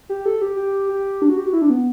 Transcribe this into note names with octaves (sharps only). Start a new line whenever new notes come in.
G4
A4
G4
G4
G4
D4
F#4
G4
F#4
E4
D4
B3